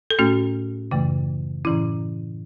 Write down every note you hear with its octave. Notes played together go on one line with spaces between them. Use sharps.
A4
A2 A3 C#4 F#4
F#2 C#3 E3 A3
A2 E3 C#4 E4